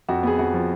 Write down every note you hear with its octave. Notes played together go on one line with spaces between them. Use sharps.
F2 F#4
B3 G#4
F2 F#4
F3